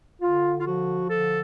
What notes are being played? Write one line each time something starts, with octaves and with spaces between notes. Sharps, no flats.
D3 F4
F4
F3 F#4
D3 A4